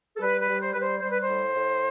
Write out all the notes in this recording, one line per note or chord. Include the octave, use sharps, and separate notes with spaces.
A4
G3 B4
B4
G3
C5
G3 B4
C5
G3 C5
B4
C5
A2
A2